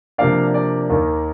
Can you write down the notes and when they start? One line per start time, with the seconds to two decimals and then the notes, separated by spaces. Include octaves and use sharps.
0.18 C3 F3 A#3 D4 D5 F5
0.54 D5
0.90 D#2 D#3 A#3